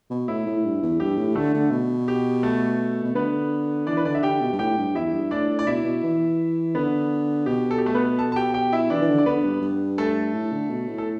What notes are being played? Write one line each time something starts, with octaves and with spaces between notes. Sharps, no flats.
B2
A2 E4
A2
G2
E2
G2 G4
A2
D3 A3 A4
D3
B2
G4
A3 A4
B2
D3 B3 B4
E3 D4 D5
B4
D3 D5
E5
D3 G4 G5
B2
G2
A2 G4 G5
G2
E2 E4 E5
G2
A2 D4 D5
A2
D5
B2 E4 E5
B2
E3
D3 B3 B4
B2 G4
A4
G4
A3 A4
B3 B4
A4 A5
A5
G4 G5
G4 G5
E4 E5
E3 D4 D5
E3
D3
D5
D3 B3 B4
G2
G2
A3 A4
A2
D3
B2
A2
A4